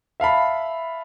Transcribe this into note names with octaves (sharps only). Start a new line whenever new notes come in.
E5 F5 A5 B5